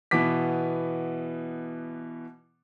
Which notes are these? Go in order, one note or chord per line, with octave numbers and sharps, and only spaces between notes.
B2 E3 B3 D6 B6